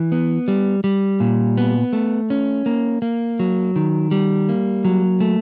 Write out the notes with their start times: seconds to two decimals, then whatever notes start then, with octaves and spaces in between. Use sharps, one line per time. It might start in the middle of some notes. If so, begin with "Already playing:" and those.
Already playing: E3
0.12 B3
0.48 G3
0.84 G3
1.20 A#2
1.57 B3
1.93 A3
2.30 C#4
2.66 A#3
3.02 A#3
3.40 F#3
3.76 D#3
4.11 G3
4.49 A#3
4.85 F#3
5.20 A3